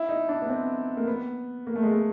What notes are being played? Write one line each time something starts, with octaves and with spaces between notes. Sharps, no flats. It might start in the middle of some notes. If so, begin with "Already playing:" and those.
Already playing: E4
D#4
D4
B3
C4
A#3
B3
A#3
A3
G#3
A3